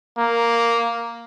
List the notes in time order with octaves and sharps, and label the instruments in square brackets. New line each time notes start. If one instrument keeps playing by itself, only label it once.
[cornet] A#3